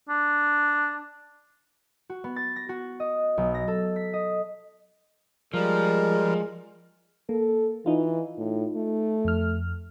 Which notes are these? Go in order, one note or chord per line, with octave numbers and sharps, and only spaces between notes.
D4
F#4
B3
A6
A#6
F#4
D#5
B1
A#6
A4
B6
D#5
F3 G3 G#3 A#4
A#3 A4
E3 D#4 F4
A2
A3
F2 F6